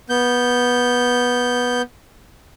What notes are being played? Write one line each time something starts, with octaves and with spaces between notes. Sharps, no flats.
B3 G6